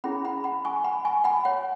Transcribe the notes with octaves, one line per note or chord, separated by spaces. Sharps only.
C#4 E4 G#4 C#5 F#5 B5
F#5 B5
F#5 B5
G#5 C#6
F#5 B5
G#5 C#6
F#5 B5
C#5 F#5